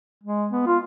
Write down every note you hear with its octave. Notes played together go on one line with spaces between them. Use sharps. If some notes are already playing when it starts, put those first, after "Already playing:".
G#3
B3
F4